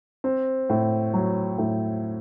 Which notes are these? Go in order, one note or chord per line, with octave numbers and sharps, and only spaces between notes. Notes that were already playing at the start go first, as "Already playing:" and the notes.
C4
A2
F#3
A2